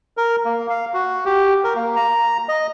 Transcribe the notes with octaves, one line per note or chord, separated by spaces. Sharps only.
A#4
A#3
F5
F#4
G4
A#4
A#3
A#5
D#5